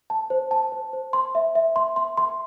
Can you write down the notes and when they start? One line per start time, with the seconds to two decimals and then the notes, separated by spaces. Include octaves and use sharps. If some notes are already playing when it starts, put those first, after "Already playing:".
0.10 A5
0.30 C5
0.51 A5
0.72 C5
0.93 C5
1.13 C6
1.35 E5
1.55 E5
1.76 C6
1.96 C6
2.17 C6